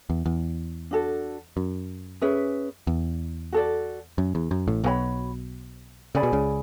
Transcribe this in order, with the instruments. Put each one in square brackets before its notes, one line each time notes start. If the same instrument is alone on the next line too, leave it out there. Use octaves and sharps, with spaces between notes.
[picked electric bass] E2
E2
[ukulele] D4 F#4 A4
[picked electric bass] F#2
[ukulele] C#4 G#4 B4 E5
[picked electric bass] E2
[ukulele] F#4 A4 D5
[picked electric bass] F#2
E2
F#2
A1 A2
[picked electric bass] B1 B2 [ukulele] F#4 C#5 G#5 B5
[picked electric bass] C#3 [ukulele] G#4 D5 G#5 B5
[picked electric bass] B2
C#2 C#3